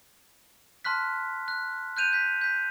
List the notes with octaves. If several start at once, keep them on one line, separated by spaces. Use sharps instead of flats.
A5 C6 F6 F#6 B6
F#6
F#6 G6 D#7 F7
G6 B6
G6 B6